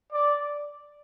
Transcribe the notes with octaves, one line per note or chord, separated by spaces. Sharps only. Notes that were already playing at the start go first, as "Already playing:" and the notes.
D5